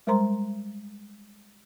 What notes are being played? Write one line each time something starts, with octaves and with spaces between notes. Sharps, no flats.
G3 G#3 A#4 C5 A#5 C6